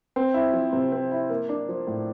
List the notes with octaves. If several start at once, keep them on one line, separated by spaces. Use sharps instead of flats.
C4
E4
F3
C3
C4
E4
A#3
D4
F3
A2